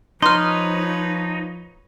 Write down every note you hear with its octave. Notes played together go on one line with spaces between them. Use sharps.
F3 D#4 B4 C#5 C6 F6